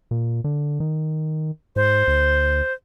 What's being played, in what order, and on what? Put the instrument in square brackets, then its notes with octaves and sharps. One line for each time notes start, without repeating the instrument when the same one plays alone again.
[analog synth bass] A#2
D3
D#3
[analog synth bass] G#2 [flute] C5
[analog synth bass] D2